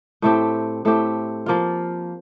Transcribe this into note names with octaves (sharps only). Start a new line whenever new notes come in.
A2 A3 C4 G4
A2 A3 C4 G4
F3 A#3 F4